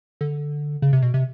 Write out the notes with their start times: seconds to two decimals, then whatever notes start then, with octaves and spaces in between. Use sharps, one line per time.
0.21 D3
0.82 C#3
0.93 C3
1.02 B2
1.14 C3